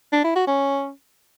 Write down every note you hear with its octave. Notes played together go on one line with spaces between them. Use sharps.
D4
E4
F#4
C#4